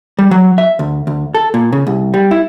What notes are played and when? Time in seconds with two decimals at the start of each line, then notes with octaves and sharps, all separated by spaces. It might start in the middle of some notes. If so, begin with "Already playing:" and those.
0.19 G3
0.31 F#3
0.58 E5
0.79 D2
1.07 D2
1.34 A4
1.54 A#2
1.73 C#3
1.87 C2
2.14 G3
2.31 E4